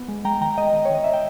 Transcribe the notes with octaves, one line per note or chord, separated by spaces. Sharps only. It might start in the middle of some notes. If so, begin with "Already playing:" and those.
Already playing: B3
G#3
G#3 G5 A#5
D#3 G5 A#5
G#3 D#5 G5
D#3
C#5
D#3 D#5
D#3 E5
G5